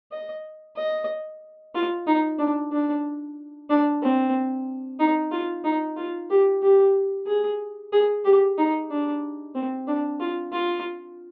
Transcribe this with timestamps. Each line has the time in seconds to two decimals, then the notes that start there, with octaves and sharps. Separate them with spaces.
0.12 D#5
0.76 D#5
1.74 F4
2.07 D#4
2.39 D4
2.72 D4
3.69 D4
4.02 C4
4.99 D#4
5.31 F4
5.64 D#4
5.96 F4
6.30 G4
6.63 G4
7.26 G#4
7.92 G#4
8.25 G4
8.58 D#4
8.90 D4
9.55 C4
9.87 D4
10.20 F4
10.52 F4